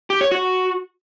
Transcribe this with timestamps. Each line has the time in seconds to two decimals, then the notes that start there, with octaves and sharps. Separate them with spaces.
0.10 G4
0.21 C#5
0.32 F#4